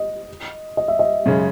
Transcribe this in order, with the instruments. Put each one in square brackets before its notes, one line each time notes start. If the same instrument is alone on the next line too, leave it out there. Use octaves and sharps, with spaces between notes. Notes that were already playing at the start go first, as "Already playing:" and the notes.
Already playing: [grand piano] D#5
D#5
E5
D#5
[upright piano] F#2 C#3 G#3 C#4 G#4